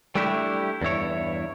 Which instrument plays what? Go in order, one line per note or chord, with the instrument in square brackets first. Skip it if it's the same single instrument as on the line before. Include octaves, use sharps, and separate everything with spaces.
[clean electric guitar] G3 A3 D4 E4 F#4 G4
E2 G2 E4 C#5